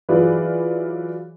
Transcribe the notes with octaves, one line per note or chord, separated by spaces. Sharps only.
E3 F#3 F4 G#4 B4 D5